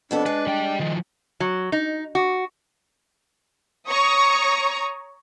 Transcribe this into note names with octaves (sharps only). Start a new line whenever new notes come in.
F2 B3 D4 A4
G#3 B4
G3 G5
D#3 F3
F#3
D#4
F#4
C#5 A#5 C#6 D#6